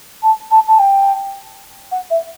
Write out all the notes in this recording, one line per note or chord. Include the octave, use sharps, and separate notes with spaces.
A5
A5
A5
G5
F#5
E5